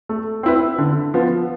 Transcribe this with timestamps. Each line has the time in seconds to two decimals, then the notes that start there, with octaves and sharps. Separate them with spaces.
0.09 A3
0.43 C4 E4 B4
0.78 D3
1.14 F3 B3